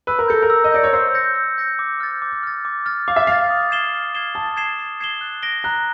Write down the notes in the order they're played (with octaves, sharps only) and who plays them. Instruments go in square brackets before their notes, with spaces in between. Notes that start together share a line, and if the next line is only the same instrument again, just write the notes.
[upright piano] B4 [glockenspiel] E6
[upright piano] A#4
[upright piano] A4 [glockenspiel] G6 A#6 C#7
[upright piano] A#4
[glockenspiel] E6
[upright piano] D#5
[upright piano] D5 [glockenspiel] G6 A#6 C#7
[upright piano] C#5
[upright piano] C5 [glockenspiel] E6
[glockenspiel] G6 A#6 C#7
E6
G6 A#6 C#7
D6
F6 A6
D6
F6 A6
D6
F6 A6
[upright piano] F5 [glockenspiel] D6
[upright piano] E5
[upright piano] F5 [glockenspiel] F6 A6
[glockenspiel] D#6
G#6 C7 E7 G7
D#6
G#6 C7 E7 G7
[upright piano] A5 [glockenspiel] D#6
[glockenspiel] G#6 C7 E7 G7
D#6
G#6 C7 E7 G7
F#6
A#6 D7 G7
[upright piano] A#5 [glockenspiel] F#6